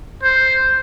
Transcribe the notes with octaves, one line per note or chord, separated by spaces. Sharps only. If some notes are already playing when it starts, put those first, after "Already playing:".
C5